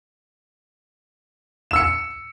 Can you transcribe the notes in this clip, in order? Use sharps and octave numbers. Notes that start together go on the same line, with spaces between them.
E6 C#7 E7